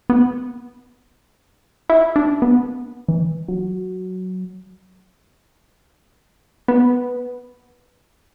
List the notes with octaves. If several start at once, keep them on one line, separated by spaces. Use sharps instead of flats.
B3
E4
D4
B3
E3
F#3
B3